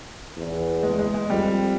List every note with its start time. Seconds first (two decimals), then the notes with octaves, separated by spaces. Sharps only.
0.37 E2
0.83 G#3
0.99 G#3
1.14 G#3
1.30 F2 G3